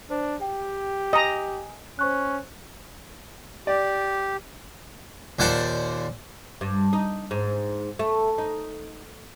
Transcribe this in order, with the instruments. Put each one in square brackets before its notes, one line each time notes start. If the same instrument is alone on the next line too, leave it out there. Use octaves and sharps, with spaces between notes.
[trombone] D4 [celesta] C5
[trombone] G4 [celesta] G5
[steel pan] D#5 A#5 [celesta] G#5
[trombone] C#4 [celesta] C5 C#6 F#6
[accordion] G4 [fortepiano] D5
[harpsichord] D#2 A#2 C5 D5 F#5 A5
[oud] G2
D#4
G#2
A3
D#4